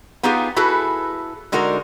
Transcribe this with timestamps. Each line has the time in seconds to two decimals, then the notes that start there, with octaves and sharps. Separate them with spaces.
0.23 B3 D#4 F4 G4 G#4
0.56 E4 F#4 G#4 A4 B4
1.52 D3 G#3 D#4 F#4 A#4